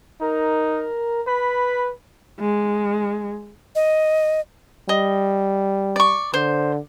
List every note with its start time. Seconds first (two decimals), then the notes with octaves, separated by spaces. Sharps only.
0.21 D#4 A#4
1.27 B4 B5
2.40 G#3
3.75 D#5
4.89 G3 D#5
5.96 D5 C#6
6.34 D3 C5